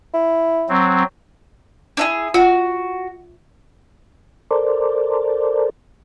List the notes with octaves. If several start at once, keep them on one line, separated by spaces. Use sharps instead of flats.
E4
F#3 C4
D4 E4 G#4
F4 F#4 F#5
A4 A#4 C5 D5